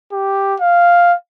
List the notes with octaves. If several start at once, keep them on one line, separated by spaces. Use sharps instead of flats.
G4
F5